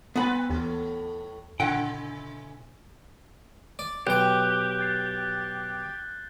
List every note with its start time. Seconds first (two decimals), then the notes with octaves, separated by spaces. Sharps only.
0.16 G2 B3 C4 B4 F#5 B5
0.50 D#2 A2 E3 A3
1.60 A#2 C#3 E4 F#5 G5
3.79 D5
4.07 B1 G4 G5 F#6 G6 G7
4.79 G6 A6 C7